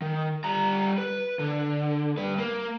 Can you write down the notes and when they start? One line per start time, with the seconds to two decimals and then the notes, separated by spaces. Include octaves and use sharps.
0.02 D#3
0.44 G3 A#5
0.98 B4
1.39 D3
2.17 G2 B4
2.38 A#3